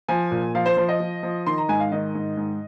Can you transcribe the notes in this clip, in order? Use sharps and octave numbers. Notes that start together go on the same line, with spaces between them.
F3 G#5
A#2
F3 F5
C5
F3 C5
D#5
F3
F3
D#3 C6
A#5
G#2 G#5
F5
D#3 D#5
G#2
G#2